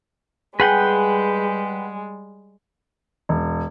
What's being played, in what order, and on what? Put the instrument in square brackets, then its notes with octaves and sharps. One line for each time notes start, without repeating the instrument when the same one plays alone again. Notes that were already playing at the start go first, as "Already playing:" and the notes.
[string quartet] G3 G#3 [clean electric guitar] G#4 [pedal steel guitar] B4 F#5 G5
[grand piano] E1